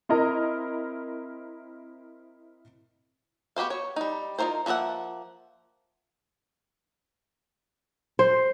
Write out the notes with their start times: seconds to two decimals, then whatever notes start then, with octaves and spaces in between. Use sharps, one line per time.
0.09 C4 E4 A#4 D#5 A#5
3.56 B3 F#4 G4 C5 F5
3.70 C#5
3.96 G3 D#4
4.39 D#4 F4 F#4 A#4 C5
4.66 F3 A#3 F4 E5 F#5
8.19 C5